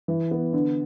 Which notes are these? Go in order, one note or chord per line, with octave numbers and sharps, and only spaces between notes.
E3
B3
D3